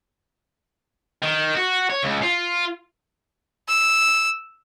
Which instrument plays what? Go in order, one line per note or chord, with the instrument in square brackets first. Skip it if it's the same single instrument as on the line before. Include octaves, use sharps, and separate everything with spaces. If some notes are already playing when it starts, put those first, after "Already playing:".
[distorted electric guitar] D#3
F#4
C#5
C#2
F4
[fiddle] E6